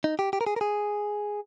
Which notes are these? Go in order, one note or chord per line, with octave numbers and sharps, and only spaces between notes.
D#4
G4
G4
A#4
G#4
A#4
G#4